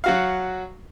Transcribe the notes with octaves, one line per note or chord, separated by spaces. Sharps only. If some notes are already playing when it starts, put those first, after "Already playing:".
F#3 F#4 F5